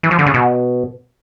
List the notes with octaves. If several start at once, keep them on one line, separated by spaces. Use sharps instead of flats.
E3
F3
D3
C#3
B2